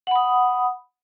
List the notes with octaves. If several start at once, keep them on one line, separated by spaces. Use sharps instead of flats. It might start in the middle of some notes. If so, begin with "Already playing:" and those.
F#5 B5 D#6